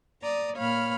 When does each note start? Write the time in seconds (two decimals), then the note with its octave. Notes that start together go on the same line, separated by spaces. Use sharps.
0.22 D5 A#5 D#6
0.57 A#2 C#5 F5 B5 F6